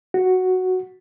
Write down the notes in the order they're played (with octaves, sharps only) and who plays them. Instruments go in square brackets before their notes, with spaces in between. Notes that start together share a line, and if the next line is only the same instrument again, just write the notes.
[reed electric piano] F#4